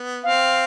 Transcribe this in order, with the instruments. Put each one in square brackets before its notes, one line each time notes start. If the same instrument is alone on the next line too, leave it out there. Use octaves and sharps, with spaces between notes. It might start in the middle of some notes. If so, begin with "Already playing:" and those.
Already playing: [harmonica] B3
[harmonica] C4 [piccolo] F5